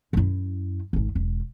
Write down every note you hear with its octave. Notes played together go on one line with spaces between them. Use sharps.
F#2 E4
D#1 G#1
E1